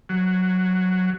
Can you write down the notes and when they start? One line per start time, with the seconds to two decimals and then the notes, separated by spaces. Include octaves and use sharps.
0.09 F#3